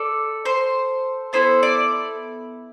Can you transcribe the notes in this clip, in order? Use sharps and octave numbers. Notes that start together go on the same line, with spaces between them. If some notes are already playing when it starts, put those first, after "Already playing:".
Already playing: A4 D5
C5
B3 E4 A4 C5
D5